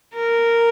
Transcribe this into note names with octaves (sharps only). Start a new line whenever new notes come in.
A#4